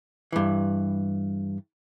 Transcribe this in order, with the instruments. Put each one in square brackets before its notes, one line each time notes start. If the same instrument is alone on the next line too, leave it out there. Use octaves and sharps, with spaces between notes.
[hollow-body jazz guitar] G2 E3